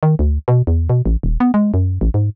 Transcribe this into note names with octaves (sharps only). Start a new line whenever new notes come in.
D#3
D2
B2
E2
B2
A1
D#1
B3
G#3
F#2
A1
G#2